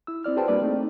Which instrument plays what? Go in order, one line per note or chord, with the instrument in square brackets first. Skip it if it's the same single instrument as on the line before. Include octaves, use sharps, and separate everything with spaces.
[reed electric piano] E4 E6
C4 E4 D5 F6
F#4 G#4 B4 C5 G5 A5
G3 A#3 D4 B4 D5
A3 C4 D#4